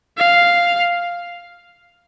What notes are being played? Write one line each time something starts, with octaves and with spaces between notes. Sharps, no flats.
F5